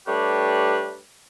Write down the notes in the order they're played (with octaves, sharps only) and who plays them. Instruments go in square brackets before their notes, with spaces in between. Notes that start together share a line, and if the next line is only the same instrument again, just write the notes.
[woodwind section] G3 A3 D4 G4 B4 C#5